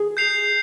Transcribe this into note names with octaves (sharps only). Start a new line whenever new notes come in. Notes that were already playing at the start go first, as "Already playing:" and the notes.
Already playing: G#4
G6 C7 F7